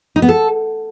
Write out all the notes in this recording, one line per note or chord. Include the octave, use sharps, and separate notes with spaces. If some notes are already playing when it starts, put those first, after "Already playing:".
D#4
B3
A4